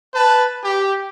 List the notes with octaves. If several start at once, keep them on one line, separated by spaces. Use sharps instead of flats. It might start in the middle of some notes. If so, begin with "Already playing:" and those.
B4 A5
G4